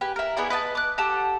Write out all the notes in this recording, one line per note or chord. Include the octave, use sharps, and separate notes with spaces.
G4 B4 G#5
E4 A#4
B3 E4 G#4 D5
B4 D#5 G5 A5
D6 F#6
G4 A4 F#5 A5